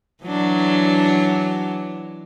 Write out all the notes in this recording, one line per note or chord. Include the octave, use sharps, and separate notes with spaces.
E3 F#3 D4